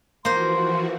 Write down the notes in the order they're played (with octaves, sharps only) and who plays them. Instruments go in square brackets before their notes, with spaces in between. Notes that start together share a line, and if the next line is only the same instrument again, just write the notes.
[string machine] E3 F3 F#4 [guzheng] A#3 C5 [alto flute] C6